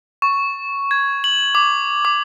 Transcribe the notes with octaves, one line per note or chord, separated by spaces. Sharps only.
C#6
G#6
F#7
D6
D6